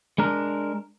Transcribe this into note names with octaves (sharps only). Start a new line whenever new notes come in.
G#3 D4 A#4